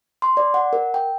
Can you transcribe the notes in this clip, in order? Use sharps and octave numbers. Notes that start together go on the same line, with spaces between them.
C6
D5
F#5
A#4
G5